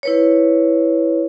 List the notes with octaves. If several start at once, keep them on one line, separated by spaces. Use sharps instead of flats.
E4 B4 C#5